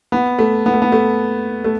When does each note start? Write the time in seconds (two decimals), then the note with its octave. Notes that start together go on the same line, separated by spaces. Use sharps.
0.12 B3
0.39 A3
0.66 B3
0.74 A3
0.82 B3
0.92 A3
1.64 A3